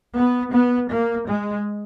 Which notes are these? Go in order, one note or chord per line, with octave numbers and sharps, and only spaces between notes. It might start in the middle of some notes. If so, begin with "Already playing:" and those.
B3
B3
A#3
G#3